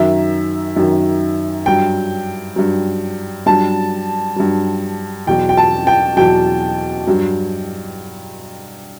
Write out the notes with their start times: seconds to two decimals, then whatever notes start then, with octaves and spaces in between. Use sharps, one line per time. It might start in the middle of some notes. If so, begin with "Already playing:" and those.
Already playing: F#2 D#3 F#3 E5
0.76 F#2 D#3 F#3
1.66 G2 F#3 G5
2.56 G2 F#3
3.46 G2 F#3 A5
4.36 G2 F#3
5.27 E2 B2 F#3 G5
5.49 G5
5.57 A5
5.87 G5
6.17 E2 B2 F#3 G5
7.07 G2 F#3